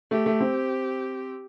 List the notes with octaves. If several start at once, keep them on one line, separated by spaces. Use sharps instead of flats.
A3 G4
A3
C4